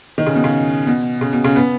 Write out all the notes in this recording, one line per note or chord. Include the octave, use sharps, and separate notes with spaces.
D#3
C#3
B2
C#3
B2
C#3
B2
C#3
B3